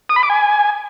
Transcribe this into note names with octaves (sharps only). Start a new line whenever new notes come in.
D#6
B5
D6
G#5